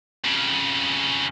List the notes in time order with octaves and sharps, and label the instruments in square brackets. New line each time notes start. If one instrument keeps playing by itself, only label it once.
[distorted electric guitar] F2 C#3